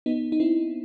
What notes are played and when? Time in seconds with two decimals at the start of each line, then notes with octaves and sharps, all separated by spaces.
0.06 B3 D#4
0.32 D#4
0.40 C4 E4